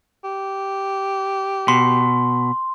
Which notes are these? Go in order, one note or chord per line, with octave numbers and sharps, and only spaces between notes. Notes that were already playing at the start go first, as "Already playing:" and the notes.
G4
B2 C6